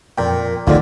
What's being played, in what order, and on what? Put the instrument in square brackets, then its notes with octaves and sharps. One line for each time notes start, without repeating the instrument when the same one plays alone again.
[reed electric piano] F2 A#4 G5 [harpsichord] A#2
[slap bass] D2 D#3 F3 [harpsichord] A#2 D3 [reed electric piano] D#4 F4 A4